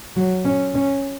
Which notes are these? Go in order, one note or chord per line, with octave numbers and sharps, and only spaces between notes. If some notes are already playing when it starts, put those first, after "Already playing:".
F#3
C#4
C#4